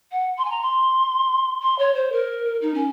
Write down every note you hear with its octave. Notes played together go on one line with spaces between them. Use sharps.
F#5
C6
G#5
A#5
C6
C6
C#5
C5
A#4
D#4
C#4